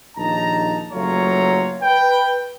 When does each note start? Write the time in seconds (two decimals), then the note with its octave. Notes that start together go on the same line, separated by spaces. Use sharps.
0.16 A#1 D#2 D#4 A5 A#5
0.92 F#1 F#3 A3 F4 C#5 A#5
1.82 B4 G5